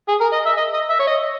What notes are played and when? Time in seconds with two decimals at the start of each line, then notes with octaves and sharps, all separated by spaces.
0.09 G#4
0.21 A#4
0.33 D#5
0.46 E5
0.58 D#5
0.74 D#5
0.90 E5
1.00 C#5
1.07 D#5